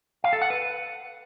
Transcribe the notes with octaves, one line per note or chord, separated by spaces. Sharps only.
F5
A4
F#5
B4